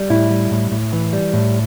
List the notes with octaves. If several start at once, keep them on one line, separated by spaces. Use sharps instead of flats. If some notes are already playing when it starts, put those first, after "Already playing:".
Already playing: G3
A2 E4
G3
A2
A2
E3
G3
A2